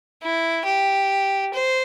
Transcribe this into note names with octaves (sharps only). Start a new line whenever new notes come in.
E4
G4
C5